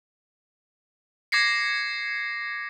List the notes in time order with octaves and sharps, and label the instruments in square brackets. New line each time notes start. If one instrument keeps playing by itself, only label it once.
[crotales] D6 G#6 A#6 C7 C#7